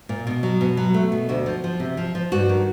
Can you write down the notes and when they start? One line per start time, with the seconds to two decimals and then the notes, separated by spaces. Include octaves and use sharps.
0.09 A#2
0.27 B2
0.43 F#3
0.61 B2
0.77 F#3
0.94 A3
1.12 B2
1.29 D2 F#4
1.46 F3
1.64 F3
1.80 C3
1.97 F3
2.15 F3
2.32 G2 F#4
2.49 D#3